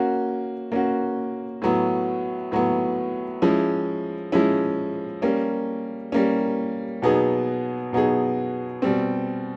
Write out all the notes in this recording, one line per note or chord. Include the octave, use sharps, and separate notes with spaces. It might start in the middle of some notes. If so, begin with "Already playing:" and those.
Already playing: A#3 C#4 F#4
A#3 C#4 F#4
A2 F#3 B3
A2 F#3 B3
F3 G#3 C#4 E4
F3 G#3 C#4 E4
G3 A#3 C#4
G3 A#3 C#4
B2 F#3 B3 D#4 G#4
B2 F#3 B3 D#4 G#4
B2 G3 C4